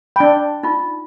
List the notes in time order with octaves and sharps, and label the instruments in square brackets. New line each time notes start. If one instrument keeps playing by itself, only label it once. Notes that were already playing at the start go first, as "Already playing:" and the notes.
[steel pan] D4 G5 [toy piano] B5
[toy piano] D#4 F4